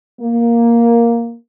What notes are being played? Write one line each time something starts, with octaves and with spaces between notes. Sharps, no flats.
A#3